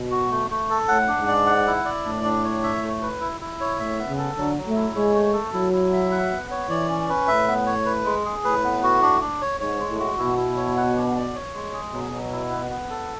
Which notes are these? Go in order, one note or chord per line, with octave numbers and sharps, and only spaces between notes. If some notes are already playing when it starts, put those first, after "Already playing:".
Already playing: B2
F#4
A3
A3
A4
A2 F#5
D4
G#2
D5
F#5
E4
D5
A2 D4
D4
C#5
E5
A3
B4
E4
E4
C#5
A2 E5
B3
C#3
A4
D3 F#3
F#3
A3
E4
G#3 C#5
A3
A4
F#3 E4
E4
E5
F#5
B3
C#5
E3 D5
C#4
B4
A2 E5
B3
C#5
B4
G#3
G#4
A2 B4
B3
F#4
D4
D4
C#5
G#2 C#5
G#3
A2
F#4
B2 E4
E4
C#5
F#5
D4
D5
C#5
G#3
G#4
B2 F#3
F#3
E4
B3
B3
A4